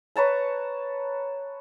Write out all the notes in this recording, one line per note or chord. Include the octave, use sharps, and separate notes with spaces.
B4 C#5 A5 A#5